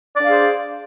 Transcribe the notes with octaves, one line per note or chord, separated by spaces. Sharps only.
D4 G#4 C5 D5 F5